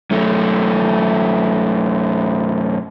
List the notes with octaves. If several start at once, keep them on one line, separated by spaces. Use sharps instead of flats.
F#2 A3